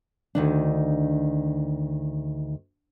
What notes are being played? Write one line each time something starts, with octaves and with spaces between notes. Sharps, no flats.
D2 D#3 D4